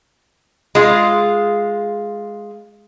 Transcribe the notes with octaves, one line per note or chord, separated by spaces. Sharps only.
G#3 F4